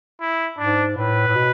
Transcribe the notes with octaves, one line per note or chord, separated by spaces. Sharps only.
E4
G#2 D4
A2 B4
A2
B2